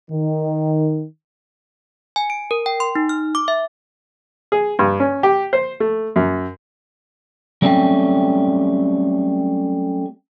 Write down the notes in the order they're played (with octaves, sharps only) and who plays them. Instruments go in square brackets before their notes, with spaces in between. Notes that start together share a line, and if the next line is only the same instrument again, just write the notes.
[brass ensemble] D#3
[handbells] G#5
D7
A#4
G5
C6
D#4
F6
D6
E5
[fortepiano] G#4
G2
C#4
G4
C5
A3
F#2
[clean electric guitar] F#3 G3 A3 C4 C#4 G4